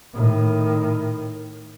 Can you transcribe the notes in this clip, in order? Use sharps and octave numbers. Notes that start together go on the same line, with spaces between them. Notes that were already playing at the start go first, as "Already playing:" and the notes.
A2 D#3